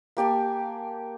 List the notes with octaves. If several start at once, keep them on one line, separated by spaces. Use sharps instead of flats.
A#3 G4 G#5 A5